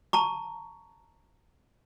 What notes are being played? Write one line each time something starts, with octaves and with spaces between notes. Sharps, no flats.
A5 A#5 C#6